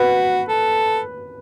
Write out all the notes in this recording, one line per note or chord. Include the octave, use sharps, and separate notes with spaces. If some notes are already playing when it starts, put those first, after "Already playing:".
Already playing: F#4 B4
A4